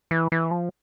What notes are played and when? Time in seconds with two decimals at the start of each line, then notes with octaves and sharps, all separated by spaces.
0.11 E3
0.32 E3
0.51 F3